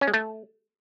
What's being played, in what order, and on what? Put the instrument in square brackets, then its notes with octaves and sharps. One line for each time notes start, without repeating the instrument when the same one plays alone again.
[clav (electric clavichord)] C#4
G#3
A3